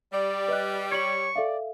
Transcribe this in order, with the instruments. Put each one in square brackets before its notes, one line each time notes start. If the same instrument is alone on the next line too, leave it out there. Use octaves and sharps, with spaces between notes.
[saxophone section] G3 [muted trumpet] D5
[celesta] B4 D#5 F#6
[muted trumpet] C#5 [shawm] C#6 [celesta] G#6 F#7
[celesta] A4 E5 F5 [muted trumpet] D5